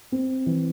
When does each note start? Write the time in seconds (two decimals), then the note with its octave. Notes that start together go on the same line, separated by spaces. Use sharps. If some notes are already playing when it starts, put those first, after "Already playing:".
0.12 C4
0.46 E3